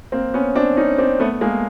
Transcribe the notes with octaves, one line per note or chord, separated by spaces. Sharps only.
A#3 C4
B3 C#4
C4 D4
C#4 D#4
C4 D4
A3 B3
G#3 A#3